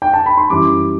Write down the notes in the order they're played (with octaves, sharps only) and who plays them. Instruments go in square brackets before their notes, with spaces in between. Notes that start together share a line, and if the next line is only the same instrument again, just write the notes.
[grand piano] G5
A5
B5
C6
F#2 E3 G3 D6